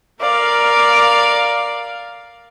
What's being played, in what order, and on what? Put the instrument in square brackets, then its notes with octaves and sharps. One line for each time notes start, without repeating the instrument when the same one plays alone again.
[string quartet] A#4 D5 F5